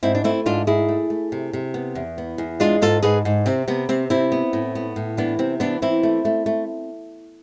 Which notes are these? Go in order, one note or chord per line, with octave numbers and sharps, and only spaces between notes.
G#2 C4 E4
D4
A3 C4 E4
G#2 D4 F4
G#2 E4 G#4
A3
A3
C3
C3
B3
E2
B3
E2
G#3 D4 F4
G#2 F4 A4
G#2 G#4 B4
G#2
C3 C4
C3 B3
C3 C4
C3 C4 E4
B3
A2
B3
A2
E3 B3 D4
C3 C4
E3 B3 D4
E3 C4 E4
A3
A3
A3